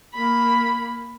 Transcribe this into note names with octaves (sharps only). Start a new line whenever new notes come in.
A#3 B5